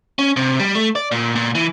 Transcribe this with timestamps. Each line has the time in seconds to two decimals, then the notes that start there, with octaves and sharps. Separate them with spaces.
0.19 C#4
0.36 C3
0.60 G3
0.75 A3
0.95 D5
1.12 A#2
1.36 A#2
1.55 E3